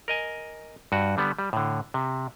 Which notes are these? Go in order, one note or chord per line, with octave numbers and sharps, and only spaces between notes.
A#4 D#5 G#5
G2 F#4
D3 G3 B3
G3
A2 D3
C3